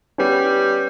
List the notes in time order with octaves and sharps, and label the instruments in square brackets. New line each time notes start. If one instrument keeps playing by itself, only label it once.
[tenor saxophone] G3 [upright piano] B3 C#4